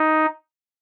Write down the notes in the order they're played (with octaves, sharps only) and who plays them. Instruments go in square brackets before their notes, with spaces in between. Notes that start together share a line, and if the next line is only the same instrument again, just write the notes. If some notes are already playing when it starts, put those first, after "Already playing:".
Already playing: [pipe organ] D#4